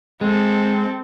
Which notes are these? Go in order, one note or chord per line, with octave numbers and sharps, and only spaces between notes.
G#3 C4 A4